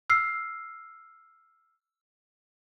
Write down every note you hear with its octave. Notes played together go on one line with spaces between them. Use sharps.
E6 F6 C7